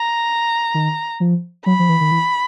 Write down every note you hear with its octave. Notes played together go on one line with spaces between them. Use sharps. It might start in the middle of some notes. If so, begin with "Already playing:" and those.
Already playing: A#5
D#3
F3
F#3 B5
F3
E3
D#3
E3